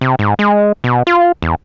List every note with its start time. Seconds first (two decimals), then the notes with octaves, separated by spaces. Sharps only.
0.01 C3
0.19 G#2
0.39 G#3
0.84 B2
1.07 F4
1.42 E2